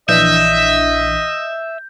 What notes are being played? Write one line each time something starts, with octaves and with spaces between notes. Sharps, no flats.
A#1 E3 D4 D#5 E5 G6